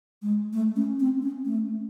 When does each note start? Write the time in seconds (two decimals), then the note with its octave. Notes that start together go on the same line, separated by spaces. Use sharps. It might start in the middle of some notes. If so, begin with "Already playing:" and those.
0.22 G#3
0.53 A3
0.76 C#4
1.00 C4
1.23 C#4
1.46 A3